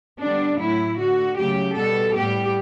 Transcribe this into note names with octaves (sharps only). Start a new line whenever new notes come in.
D3 G3 B3 D4
A2 F#3 A3 E4
D3 A3 F#4
C#3 F#3 A3 G4
B2 G3 B3 A4
A2 G3 B3 G4